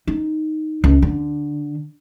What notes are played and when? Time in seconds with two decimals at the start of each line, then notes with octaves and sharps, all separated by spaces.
0.07 D#4
0.84 C#2
1.02 D3